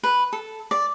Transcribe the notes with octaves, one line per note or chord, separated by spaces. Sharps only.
B4
A4
D5